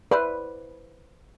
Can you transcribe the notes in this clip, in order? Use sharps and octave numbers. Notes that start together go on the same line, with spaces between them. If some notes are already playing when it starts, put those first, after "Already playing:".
E4 B4 C5 D5